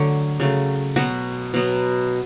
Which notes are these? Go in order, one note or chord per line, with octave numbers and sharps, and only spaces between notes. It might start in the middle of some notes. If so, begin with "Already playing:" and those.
Already playing: D3 F#3 A3 C#5
C#3 F#3 A3
B2 F#3 B3 F#4
B2 F#3 B3